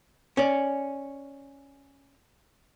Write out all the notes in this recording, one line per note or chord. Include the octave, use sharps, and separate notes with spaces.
C#4 D5